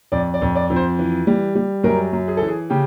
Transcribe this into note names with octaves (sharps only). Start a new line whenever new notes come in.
F2 D5
D5
F2
D5
F2
C5
E3
G3
G3
F#2 A#4
F#2
G#4
E3 A4
G#4
C#3 G4